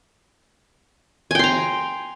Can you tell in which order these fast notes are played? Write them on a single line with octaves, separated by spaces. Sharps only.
G#5 G5 C6 A#5